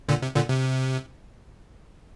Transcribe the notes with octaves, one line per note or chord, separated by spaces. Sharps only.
A#2 D3
C3
A#2 D3
C3